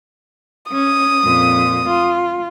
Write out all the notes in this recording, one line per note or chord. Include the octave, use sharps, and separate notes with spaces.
C#4 D#6
F2 A#2
F4